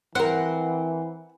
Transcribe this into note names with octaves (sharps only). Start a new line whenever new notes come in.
E3 C4 A#4 F#5